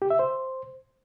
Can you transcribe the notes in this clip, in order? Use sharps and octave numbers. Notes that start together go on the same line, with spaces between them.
G4
E5
C5